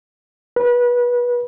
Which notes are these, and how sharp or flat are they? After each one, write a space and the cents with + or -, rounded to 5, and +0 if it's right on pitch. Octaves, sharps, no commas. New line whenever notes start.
B4 -25